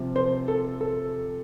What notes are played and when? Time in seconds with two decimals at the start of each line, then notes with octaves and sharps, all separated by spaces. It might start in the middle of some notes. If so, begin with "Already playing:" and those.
Already playing: C3 F3
0.16 C5
0.48 A4
0.81 A4